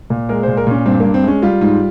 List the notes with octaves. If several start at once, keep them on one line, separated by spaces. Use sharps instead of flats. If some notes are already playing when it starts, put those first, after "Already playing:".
A#2
G#3 A#4
A#2 C5
A#4
A#2 C#4
G2 C4
G2 A#3
C4
G#3 C#4
G3 F4
G#2